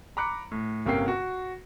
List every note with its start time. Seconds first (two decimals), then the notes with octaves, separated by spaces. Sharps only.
0.17 A#5 B5 D6 F#6 C#7
0.51 A2
0.86 G1 C3 A#3 C#4 G5 C7
1.08 F#4